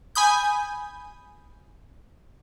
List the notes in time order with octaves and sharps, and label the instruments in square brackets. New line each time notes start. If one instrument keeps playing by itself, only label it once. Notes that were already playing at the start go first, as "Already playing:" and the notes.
[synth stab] G#5 B5 D#6 G6